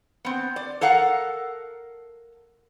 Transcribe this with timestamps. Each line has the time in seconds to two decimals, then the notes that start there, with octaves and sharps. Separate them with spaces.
0.25 B3 C4
0.56 D5
0.81 A4 A#4 F5 F#5